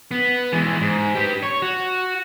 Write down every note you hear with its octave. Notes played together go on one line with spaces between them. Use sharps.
B3
E3 G#3
G#2
G4 B4
C#5
F#4